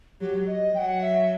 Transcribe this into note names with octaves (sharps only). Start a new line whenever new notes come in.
F#3 G4
D#5
F#3 F#5 G5
E5